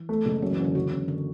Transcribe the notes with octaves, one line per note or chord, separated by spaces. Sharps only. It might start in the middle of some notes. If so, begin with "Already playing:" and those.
Already playing: E3
A3
F#1
G#3
F#2 F#3
E3
F#2 D3
C#3 F#4
F#2
D3